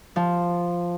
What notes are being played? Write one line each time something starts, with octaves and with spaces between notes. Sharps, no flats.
F3